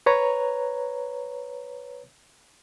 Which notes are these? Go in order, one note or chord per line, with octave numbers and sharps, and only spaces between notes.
B4 C#5 A#5